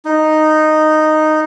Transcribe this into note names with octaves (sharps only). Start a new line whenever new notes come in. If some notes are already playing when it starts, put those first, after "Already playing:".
D#4